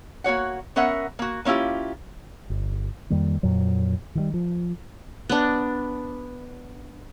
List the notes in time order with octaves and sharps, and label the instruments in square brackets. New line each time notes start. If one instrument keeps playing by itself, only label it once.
[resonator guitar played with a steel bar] A#3 F#4 C#5 F#5
B3 C#4 A#4 E5 F#5
A#3 F#4
A#3 C#4 E4 F4 G4
[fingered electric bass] G1
F2 D#3 G3 A#3
F2 A#2 F#3
D#3 E3 G3
F3
[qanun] B3 D4